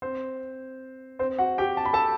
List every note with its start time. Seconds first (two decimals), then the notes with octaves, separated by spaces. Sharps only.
0.02 C4 C5
1.19 C4 C5
1.39 F#4 F#5
1.58 G4 G5
1.77 A5
1.85 B5
1.93 A4 A5